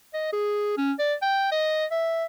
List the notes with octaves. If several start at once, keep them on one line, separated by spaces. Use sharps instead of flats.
D#5
G#4
C#4
D5
G5
D#5
E5